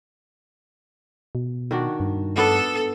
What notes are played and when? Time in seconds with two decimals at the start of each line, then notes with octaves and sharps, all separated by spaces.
1.35 B2
1.71 D#3 D4 F#4
2.00 G2
2.37 B3 D4 A4 B4